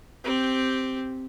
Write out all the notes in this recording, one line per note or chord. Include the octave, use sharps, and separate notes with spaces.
C4 G4